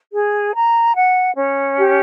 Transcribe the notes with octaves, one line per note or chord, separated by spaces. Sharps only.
G#4
A#5
F#5
C#4
G4